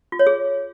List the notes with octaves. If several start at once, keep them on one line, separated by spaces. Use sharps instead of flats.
F4
C#5
G#4